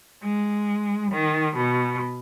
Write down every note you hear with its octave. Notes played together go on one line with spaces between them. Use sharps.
G#3
D#3
B2